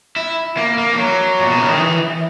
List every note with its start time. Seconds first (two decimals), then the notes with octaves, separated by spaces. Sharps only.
0.16 E4
0.57 A#3
0.78 A#3
0.92 E3
0.98 F#3
1.39 A#2
1.50 B2
1.59 C#3
1.69 D#3
1.79 E3